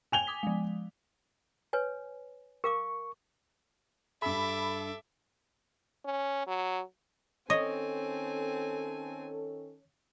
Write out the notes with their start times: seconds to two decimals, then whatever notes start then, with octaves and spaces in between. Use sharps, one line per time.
0.12 G5 G#5 G#6 F7 G7
0.27 D6 D#6 B6
0.43 F3 G#3
1.73 B4 C#5 G#5
2.64 A#4 F5 C#6 D6
4.22 G2 G4 A4 E5 B5 D6 E6
6.05 C#4
6.47 F#3
7.50 D#3 C4 C#4 A4 C#5 D#5 G#5